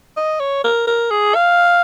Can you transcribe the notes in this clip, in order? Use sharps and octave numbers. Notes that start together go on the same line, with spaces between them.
D#5
C#5
A#4
A#4
G#4
F5